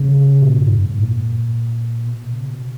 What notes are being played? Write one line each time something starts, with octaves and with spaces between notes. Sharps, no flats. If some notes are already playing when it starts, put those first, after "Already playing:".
Already playing: C#3
A#2
G#2
F#2
G#2
A#2
B2
A#2
C#3
B2